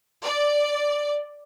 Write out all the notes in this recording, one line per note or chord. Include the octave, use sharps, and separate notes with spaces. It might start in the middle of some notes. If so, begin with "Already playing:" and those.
D5